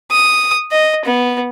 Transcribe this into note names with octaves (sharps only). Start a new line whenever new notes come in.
D#6
D#5
B3